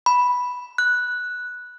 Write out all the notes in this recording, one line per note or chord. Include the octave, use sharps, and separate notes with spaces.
B5
F#6